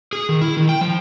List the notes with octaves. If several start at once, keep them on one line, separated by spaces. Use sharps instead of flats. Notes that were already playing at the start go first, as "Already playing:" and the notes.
G#4
D#3
E4
D#3
G5
F3